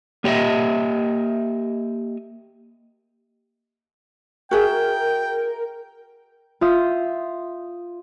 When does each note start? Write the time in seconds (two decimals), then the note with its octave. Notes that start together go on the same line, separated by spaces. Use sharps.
0.24 A#3 G4 C#5 D#5 E5
4.51 F#4 G#4 A#4 E5 G5
6.61 F4 E5 D#6 G6